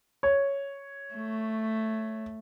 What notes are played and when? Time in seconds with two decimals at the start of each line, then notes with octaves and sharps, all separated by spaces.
0.23 C#5
1.15 A3